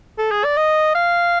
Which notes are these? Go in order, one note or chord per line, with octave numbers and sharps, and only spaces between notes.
A4
G#4
D5
D#5
F5